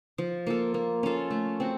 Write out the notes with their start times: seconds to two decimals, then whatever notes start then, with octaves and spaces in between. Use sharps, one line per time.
0.18 F3
0.47 A#3 F4 A4
0.74 A#3
1.03 C#4 F4 A4
1.31 A3
1.60 C4 F#4